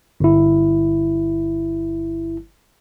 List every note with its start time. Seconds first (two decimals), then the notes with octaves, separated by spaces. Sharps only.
0.20 G1 E4